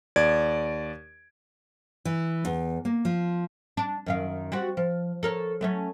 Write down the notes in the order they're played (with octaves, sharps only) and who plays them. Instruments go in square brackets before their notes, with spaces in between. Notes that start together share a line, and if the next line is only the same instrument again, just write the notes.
[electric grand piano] D#2 D5 G#6 D7
[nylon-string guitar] E3
E2
A#3
F3
[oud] D4
F#2 D#3 F5
G3 C4 F#4
F3
A4 A#4 C#5
F#3 A3 C#4